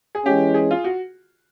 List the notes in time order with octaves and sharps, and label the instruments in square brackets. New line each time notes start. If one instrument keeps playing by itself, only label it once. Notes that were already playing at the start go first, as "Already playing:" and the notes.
[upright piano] G#4
[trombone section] E3 G#3 C#4 [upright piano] G4
[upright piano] G#4
F4
F#4